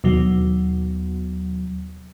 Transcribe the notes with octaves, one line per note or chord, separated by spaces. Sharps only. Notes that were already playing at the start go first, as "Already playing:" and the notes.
D#2 B2 F#3